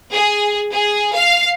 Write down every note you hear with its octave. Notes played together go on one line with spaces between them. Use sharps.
G#4
G#4
F5